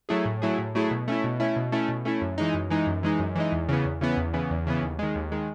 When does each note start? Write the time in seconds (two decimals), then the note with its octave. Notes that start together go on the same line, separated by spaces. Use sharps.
0.09 F#3 A3 E4 G#4
0.25 A2
0.42 F#3 A3 E4 G#4
0.58 A2
0.75 F#3 A3 E4 G#4
0.91 B2
1.08 A3 C#4 E4
1.24 B2
1.40 A3 C#4 E4
1.56 B2
1.72 A3 C#4 E4
1.89 B2
2.05 A3 C#4 E4
2.22 F#2
2.38 E3 G#3 D#4
2.54 F#2
2.70 E3 G#3 D#4
2.87 F#2
3.03 E3 G#3 D#4
3.19 F#2
3.36 E3 G#3 D#4
3.52 E2
3.69 C#3 E3 B3
3.85 E2
4.01 C#3 E3 B3
4.17 E2
4.34 C#3 E3 B3
4.50 E2
4.67 C#3 E3 B3
4.83 D#2
4.99 D#3 G#3
5.15 D#2
5.32 D#3 G#3